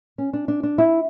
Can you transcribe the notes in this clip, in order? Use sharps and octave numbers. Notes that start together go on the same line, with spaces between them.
C#4
D4
D4
D4
E4